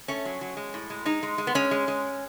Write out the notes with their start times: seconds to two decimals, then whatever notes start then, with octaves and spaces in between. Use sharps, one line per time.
0.08 A3 C#4
0.25 F#3
0.41 F#3
0.57 G#3
0.74 A2
0.90 G#3
1.05 G#3 D#4
1.23 G#3
1.38 G#3
1.47 B3
1.55 G#3 C#4
1.71 G#3
1.88 G#3